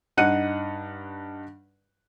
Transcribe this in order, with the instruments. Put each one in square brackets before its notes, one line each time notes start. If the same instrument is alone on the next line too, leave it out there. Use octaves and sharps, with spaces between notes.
[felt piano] G2 D#4 F#5 F#6 C#7 D#7